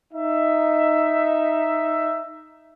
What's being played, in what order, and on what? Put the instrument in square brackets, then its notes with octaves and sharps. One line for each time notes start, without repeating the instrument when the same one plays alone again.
[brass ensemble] D#4 E5